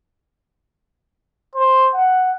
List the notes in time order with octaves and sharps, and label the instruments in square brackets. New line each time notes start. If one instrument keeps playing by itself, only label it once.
[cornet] C5
F#5